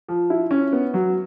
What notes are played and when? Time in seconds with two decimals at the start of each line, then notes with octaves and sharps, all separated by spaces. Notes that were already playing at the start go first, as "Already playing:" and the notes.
0.09 F3
0.30 E4
0.51 C#4
0.73 B3
0.94 F#3